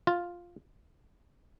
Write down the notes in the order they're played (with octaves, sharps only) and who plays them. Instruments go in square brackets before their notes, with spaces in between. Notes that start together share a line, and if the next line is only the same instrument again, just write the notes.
[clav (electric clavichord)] F4